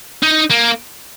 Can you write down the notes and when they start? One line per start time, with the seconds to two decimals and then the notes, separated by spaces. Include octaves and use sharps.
0.23 D#4
0.50 A#3